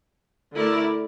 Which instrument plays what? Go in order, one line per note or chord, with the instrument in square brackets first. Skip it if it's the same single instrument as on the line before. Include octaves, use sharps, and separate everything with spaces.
[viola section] D3 A3 E4 A#4 D5